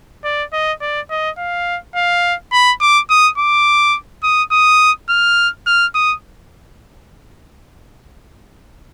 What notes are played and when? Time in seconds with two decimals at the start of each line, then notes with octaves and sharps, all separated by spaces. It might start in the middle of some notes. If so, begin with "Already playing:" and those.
0.24 D5
0.52 D#5
0.81 D5
1.10 D#5
1.38 F5
1.95 F5
2.52 B5
2.80 D6
3.10 D#6
3.37 D6
4.23 D#6
4.51 D#6
5.09 F6
5.66 F6
5.94 D#6